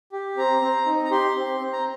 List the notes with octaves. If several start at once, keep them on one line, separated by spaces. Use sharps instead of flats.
G4
C4 A#5
C4
D#4
A#5
G4 C6
C4
C4
A#5